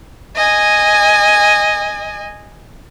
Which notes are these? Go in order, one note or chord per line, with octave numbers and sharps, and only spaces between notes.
D#5 G#5